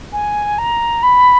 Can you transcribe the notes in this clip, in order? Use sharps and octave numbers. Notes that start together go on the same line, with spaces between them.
G#5
A#5
B5